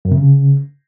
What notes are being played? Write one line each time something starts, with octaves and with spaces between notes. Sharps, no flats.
F#2
C3
C#3